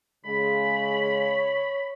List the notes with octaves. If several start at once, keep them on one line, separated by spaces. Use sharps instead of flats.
C#3 G#3 B5
C#5